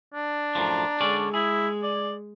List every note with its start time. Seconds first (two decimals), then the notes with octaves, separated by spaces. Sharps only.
0.14 D4
0.55 F#2 A2 F3 A#5
1.01 D3 G#3 C#4 D5
1.34 E4 G#4
1.83 D5